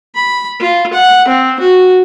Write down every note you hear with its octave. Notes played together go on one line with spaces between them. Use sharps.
B5
F4
F#5
C4
F#4